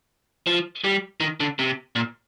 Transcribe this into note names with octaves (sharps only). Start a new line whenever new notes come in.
F3
G3
D#3
D3
C3
A#2